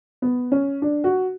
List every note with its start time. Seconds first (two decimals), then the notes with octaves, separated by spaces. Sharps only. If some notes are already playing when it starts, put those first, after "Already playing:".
0.22 B3
0.52 C#4
0.82 D4
1.04 F#4